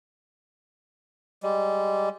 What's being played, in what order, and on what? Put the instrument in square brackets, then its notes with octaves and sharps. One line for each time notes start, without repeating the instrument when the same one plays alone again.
[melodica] G3 G#3